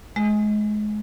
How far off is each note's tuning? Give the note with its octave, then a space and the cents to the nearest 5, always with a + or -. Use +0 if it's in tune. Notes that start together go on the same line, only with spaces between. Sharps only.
G#3 +30